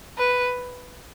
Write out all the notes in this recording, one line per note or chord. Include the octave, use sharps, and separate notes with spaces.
B4